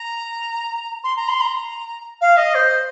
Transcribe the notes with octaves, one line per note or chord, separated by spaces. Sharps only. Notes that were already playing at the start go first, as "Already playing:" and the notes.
Already playing: A#5
C6
A#5
C6
A#5
F5
D#5
C5